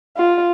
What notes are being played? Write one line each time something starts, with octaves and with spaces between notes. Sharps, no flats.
F4